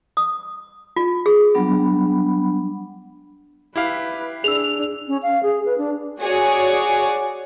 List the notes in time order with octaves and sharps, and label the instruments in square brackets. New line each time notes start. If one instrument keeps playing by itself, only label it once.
[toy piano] D#6
F4
G#4
[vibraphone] F#3 G3 B3 D4 F#5 B5
[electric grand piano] E4 G4 F5 [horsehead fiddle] B4
[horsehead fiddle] D4 [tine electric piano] G#4 E6 [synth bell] F7
[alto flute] C#4
F5
G#4
B4
D4
[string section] F#4 G#4 C#5 D5